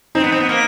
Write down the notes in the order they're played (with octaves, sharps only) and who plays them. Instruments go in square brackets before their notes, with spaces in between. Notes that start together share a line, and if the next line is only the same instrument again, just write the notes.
[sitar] C4 [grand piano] D#4
[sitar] B3
C4
B3
A#3